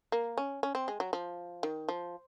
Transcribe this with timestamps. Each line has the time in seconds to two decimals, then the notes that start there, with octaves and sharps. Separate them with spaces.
0.12 A#3
0.38 C#4
0.63 C#4
0.75 C4
0.88 G#3
1.00 F#3
1.13 F3
1.63 D#3
1.89 F3